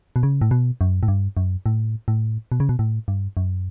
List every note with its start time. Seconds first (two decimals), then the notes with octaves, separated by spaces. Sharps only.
0.16 B2
0.23 C#3
0.41 A2
0.51 B2
0.81 F#2
1.03 A2
1.08 G2
1.37 F#2
1.66 A2
2.08 A2
2.52 B2
2.60 C#3
2.69 B2
2.79 A2
3.08 G2
3.37 F#2